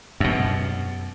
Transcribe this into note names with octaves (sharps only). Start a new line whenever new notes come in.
F#2 B2